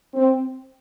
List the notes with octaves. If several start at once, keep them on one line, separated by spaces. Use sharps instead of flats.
C4